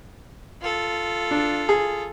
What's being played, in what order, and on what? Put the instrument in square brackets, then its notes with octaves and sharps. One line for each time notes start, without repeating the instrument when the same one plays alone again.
[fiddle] F4 A4
[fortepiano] D4
G#4